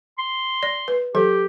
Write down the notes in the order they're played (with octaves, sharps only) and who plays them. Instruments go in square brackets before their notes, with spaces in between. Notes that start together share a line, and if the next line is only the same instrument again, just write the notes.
[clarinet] C6
[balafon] D5
B4
[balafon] E3 F#3 A4 [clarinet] G4